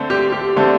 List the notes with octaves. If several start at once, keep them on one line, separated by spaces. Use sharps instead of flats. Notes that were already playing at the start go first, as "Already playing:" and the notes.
Already playing: D3 A3 C4
G4
G4
D3 A3 C4